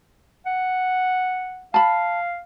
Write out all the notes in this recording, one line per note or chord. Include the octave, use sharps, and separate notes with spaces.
F#5
F5 A5 B5